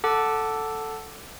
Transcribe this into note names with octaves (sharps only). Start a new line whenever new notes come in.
A4 F#5 A5 D6